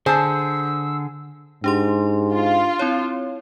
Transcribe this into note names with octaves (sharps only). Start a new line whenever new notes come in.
D3 G#4 C5 A5 E6
G#2 D4 G4 C6
F4
C4 E4 C#5